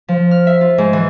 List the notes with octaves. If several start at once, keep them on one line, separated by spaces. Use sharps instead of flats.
F3
F6
E5
F4
G#2
E3